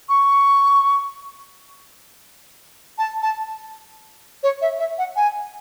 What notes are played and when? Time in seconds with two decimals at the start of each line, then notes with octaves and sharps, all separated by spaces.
0.09 C#6
2.98 A5
3.22 A5
4.43 C#5
4.61 E5
4.79 E5
4.98 F#5
5.16 G#5